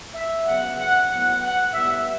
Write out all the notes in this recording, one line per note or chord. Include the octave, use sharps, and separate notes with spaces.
E5
C#3 F#3 B3 F#5
F#5
A2 F#3 B3 F#5
F#5
A2 G3 B3 E5